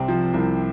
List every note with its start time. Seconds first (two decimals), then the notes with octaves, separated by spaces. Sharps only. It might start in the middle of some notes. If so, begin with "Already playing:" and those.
Already playing: C2 C3 C4
0.08 F3
0.34 C2